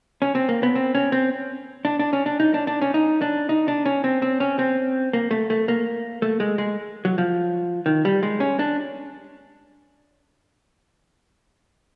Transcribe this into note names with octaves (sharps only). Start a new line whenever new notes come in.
C#4
C4
A#3
B3
C4
C#4
C4
D4
D4
C#4
D4
D#4
D4
D4
C#4
D#4
D4
D#4
D4
C#4
C4
C4
C#4
C4
A#3
A3
A3
A#3
A3
G#3
G#3
F#3
F3
D#3
G3
G#3
C#4
D4